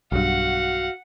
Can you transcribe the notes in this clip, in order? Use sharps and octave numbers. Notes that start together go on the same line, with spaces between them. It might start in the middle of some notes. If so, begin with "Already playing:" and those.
B1 G2 F#4 F5 F#5